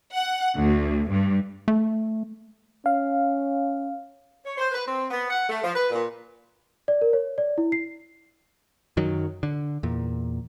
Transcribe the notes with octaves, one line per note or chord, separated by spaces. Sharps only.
F#5
D2
G2
A3
C#4 F5
C#5
C5
B4
C4
B3
F#5
A3
F3
B4
A#2
D5
A#4
C#5
D5
E4
C7
F#2 D#3 F#3
D3
E2 A#2